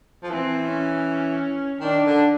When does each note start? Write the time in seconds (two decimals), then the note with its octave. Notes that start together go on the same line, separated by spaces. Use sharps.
0.23 F3
0.30 E3 C4
0.67 C#4
1.80 D#3 D4
2.06 D3